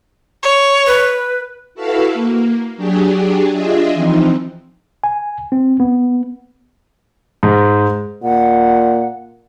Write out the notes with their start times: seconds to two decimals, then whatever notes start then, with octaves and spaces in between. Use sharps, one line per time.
0.43 C#5
0.87 B4
1.75 E4 F#4 A4 B4 E5 F5
2.14 A#3
2.77 F#3 D4 G4 G#4
3.53 D4 F4 G#4 D#5 E5
3.94 E3 F3 C4 D#4
5.04 G#5
5.52 C4
5.80 B3
7.43 G#2
8.23 A#2 F#5